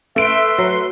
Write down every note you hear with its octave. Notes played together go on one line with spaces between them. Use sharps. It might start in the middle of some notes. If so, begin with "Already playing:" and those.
A3 B4 E5 C6 D7
F#3